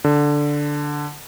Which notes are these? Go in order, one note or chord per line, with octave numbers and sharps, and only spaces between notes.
D3